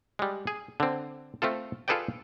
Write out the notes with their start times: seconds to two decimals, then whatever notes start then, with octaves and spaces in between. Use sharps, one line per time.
0.19 G3 G#3
0.47 G#4
0.80 D3 C4
1.42 A3 C4 F4 A4
1.88 F4 G#4 A4 B4 D5 G5